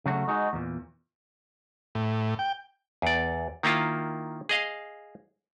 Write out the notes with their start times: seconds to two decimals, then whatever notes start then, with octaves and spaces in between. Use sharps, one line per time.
0.06 C#3 F#3 A3 F#4
0.28 G#3 D#4 F#4
0.53 E2 A#2
1.95 A2
2.39 G5
3.02 E2 D5
3.63 D#3 A#3 E4 F4
4.49 G#4 D#5 F5